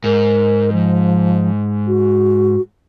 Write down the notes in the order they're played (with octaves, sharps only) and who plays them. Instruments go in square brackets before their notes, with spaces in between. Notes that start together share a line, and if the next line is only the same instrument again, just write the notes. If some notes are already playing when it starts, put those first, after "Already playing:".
[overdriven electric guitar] G#2 [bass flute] A#4
[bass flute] F3
F#4